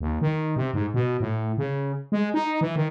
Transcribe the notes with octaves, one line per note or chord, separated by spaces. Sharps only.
D#2
D#3
C3
G#2
B2
A2
C#3
G#3
D#4
E3
D#3